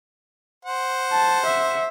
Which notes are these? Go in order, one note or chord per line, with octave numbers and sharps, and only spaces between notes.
C5 F#5
A5
E5